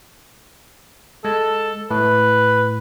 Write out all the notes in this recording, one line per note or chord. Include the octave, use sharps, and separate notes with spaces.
G#3 A4
A2 B4